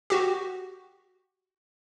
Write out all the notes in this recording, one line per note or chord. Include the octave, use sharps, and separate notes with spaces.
F#4 G4